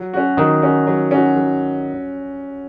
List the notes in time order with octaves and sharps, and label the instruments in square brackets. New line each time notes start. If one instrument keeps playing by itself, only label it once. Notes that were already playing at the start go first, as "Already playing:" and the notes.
Already playing: [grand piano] F#3
C#4 F#4
[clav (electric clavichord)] D#3 [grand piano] F#3
[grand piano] C#4 F#4
F#3
C#4 F#4
F#3